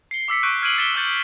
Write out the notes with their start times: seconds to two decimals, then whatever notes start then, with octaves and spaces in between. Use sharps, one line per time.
0.11 C7 C#7 G7
0.28 D6 E6 B6 C#7
0.43 C#6 F#6 G6 B6 D7
0.62 F6 G#6 C7 D7 D#7 F#7
0.78 A6 B6 C#7 D7 E7 G7
0.96 D6 E6 F#6 G6 A6 C#7